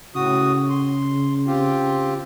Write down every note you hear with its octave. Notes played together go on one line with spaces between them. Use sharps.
A2 C#3 F#4 D#6
C6
C4 F4 G4